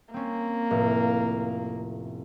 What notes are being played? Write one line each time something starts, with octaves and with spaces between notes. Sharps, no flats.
A#3 C4 C#4
F1 A2